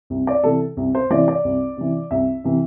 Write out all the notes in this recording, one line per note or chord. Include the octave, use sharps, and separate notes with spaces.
C2
D5
C3 E3 A4
C2
C5
C3 E3 D5
D5
C2
C3 E3
C2 E5
C3 E3